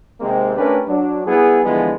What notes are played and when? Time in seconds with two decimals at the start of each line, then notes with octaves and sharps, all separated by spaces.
0.20 C3 D#3 G#3 A#3 C4
0.56 A3 C#4 D4 G4 A#4 B4
0.87 F#3 D4
1.26 G3 B3 E4 G#4
1.63 D3 E3 F3 G3 G#3 B3